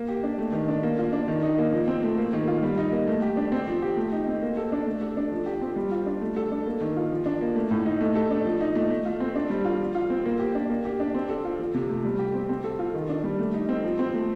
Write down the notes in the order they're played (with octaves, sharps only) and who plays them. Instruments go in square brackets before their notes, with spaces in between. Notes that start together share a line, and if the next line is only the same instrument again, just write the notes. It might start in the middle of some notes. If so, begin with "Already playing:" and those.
Already playing: [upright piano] A#3
G4
D4
A3
D#3
D4
A#3
F4
D4
D#3
D#4
A#3
F3
C4
A3
A#3
D#3
F4
G3
D#4
A#3
A3
G4
D4
C4
F3
G4
A3
D#4
C4
A#3
A4
D4
A3
A4
D4
F3
G4
C4
G3
F4
D4
A3
A4
D4
A#3
D#3
F4
F3
D4
A#3
A3
A2
D#4
A3
A4
D4
F3
D#4
A3
A3
F4
C4
D4
G3
F4
F3
F4
C4
A#3
G4
D4
A#3
G4
D4
C4
A4
F4
F3
C3
A3
G3
G4
C4
C4
A4
F4
D#3
D4
G3
A3
D#4
C4
F3
C4
A3